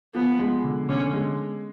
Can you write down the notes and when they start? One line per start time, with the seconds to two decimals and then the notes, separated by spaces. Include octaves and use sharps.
0.14 F3 B3
0.39 G#3
0.64 D3
0.89 D3 C#4
1.13 G#3